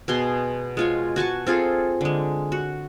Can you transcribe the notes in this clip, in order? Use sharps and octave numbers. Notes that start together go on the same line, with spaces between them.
B2 G#4 C6
G#3 F4 C#5
F#4 G#5 A5 C#6
C4 F4 G#4 A4
D3 G#3
F#4